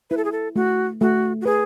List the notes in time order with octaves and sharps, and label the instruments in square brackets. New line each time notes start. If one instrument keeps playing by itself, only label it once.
[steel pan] E4 [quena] B4
[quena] A4
G#4
A4
[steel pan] A3 [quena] F#4
[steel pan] A3 [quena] F#4
[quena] F#4
[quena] G#4 [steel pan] B4